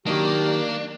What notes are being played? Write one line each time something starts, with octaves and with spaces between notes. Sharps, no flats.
D#3 F#3 A#3 D4 D#4 G4